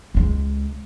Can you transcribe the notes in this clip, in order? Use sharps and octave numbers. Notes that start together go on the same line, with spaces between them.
C#2 G#3